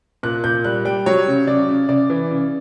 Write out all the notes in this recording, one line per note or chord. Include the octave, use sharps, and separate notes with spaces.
A#2 F#6
A#2 G6
G3 F#6
G3 G5
F#3 C#5
C#3
C#3 D5
C#3
C#3 D5
E3
C#3